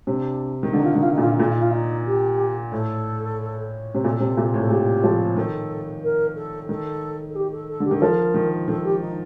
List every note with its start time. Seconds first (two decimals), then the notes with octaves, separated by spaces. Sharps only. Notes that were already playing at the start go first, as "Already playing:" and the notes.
0.07 C3 D4
0.63 D#3
0.73 D3 D#4
0.83 F4
0.93 D#3 D#4
1.02 F4
1.12 D#4
1.17 A#2
1.22 F4
1.32 D#4
1.40 A#2 F4
1.51 D#4
1.61 F4
1.71 D#4
2.06 G4
2.72 A2 A4
3.95 C3
4.04 A#2 A4
4.20 C3
4.37 A#2
4.54 A2
4.61 A4
4.70 A#2 G4
5.04 F3
5.37 D#3 A4
6.03 A#4
6.36 A4
6.69 D#3 A4
7.29 A4
7.35 G4
7.52 A4
7.68 A4
7.80 D3 G4
7.91 D#3
7.96 A4
8.01 F3 A#4
8.34 D#3
8.68 D#3 A4
8.84 G4
9.00 D#4